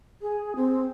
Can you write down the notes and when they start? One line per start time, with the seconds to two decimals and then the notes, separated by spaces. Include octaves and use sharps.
0.22 G#4
0.56 C4